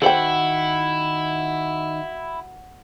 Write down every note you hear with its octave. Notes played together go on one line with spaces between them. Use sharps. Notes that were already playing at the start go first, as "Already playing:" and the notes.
D#3 E4 F#4 A4 C5 F#5 G5